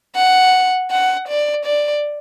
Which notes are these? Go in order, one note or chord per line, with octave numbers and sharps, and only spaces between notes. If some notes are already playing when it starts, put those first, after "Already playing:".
F#5
F#5
D5
D5